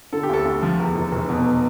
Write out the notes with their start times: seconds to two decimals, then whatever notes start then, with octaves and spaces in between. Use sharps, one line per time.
0.13 D3 A4
0.23 G4
0.29 D2 A4
0.45 D2
0.62 F3
0.79 E2
0.95 F1
1.12 F1
1.29 B2